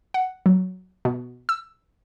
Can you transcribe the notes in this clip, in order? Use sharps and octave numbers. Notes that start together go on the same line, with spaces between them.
F#5
F#3
B2
E6